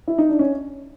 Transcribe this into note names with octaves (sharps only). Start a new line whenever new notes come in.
E4
D#4
D4
C#4